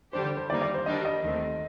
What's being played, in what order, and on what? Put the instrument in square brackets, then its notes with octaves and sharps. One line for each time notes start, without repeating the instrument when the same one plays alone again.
[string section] D3 G3 D4 G4 [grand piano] C5
[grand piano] C5
[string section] D#3 G3 A#3 D#4 [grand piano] D5
[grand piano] D5
C5
[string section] D#3 G3 D4 [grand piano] D#5
[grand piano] D#5
[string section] D#2 D#3 A3 C4